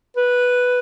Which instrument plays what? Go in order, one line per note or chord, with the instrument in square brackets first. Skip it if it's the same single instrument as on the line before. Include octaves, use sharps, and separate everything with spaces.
[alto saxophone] B4